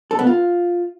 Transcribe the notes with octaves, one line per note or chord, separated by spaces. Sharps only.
A4
B3
F4